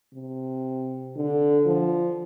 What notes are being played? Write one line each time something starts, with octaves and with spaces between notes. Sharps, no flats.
C3
D3
F3